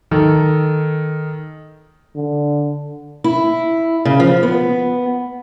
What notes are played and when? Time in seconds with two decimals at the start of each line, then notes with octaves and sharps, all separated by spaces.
0.11 D#3 A4
2.16 D3
3.24 E4
4.05 C#3
4.20 F3
4.43 B3